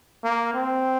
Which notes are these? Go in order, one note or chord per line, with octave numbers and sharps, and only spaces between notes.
A#3
C4